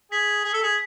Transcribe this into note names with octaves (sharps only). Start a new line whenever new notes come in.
G#4 B6
G#4
A4
G#4